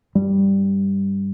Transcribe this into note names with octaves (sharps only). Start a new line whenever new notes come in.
G2 G3